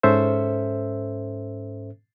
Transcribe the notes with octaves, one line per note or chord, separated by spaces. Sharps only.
G#2 C#4 A4 C5 E5